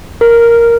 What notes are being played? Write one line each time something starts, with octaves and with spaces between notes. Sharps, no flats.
A#4